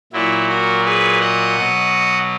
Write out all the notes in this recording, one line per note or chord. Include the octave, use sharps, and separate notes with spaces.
A#2 F#3 E4
F#4 A#4
G#4 B4
D#5 F#5
B2 F#3